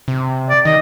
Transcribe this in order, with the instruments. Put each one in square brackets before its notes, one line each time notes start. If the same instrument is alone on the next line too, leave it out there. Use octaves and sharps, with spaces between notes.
[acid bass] C3
[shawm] D5
[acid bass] D#3 [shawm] D#5